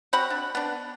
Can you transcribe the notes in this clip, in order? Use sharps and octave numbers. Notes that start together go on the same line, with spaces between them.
C4 F#4 F#5 B5
D4
B3 D4